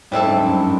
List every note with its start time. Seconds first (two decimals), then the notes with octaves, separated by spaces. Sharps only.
0.11 G#2 G3 C4 E4 A4
0.26 F#2
0.37 G2
0.47 F#2